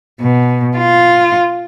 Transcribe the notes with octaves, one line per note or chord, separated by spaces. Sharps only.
B2
F4